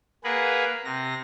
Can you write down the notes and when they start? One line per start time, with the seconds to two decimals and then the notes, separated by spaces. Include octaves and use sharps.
0.24 A#3 G#4 A#4 B4 F#5
0.85 C3 A#6